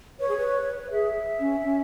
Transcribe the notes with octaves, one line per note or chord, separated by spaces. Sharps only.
B4 C#5
G#4
B4
G#4 E5
C#4
C#4